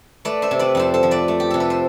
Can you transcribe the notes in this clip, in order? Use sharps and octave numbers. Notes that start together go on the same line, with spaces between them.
A3 B4 D5
C5 E5
C3
B4 D5
F2 A4 C5
A4 C5
F3
B4 D5
A3
G4
C3 A4
B4
C5